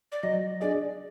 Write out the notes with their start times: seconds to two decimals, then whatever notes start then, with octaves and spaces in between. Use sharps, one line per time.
0.12 D5
0.23 F#3 D#5
0.60 D4 G#4 D5 D#5